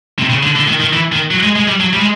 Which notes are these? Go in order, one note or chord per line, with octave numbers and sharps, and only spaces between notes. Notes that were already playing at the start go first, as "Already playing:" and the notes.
C3
C#3
D3
D3
D#3
D#3
E3
D#3
F#3
G#3
G#3
G3
F#3
G3
G#3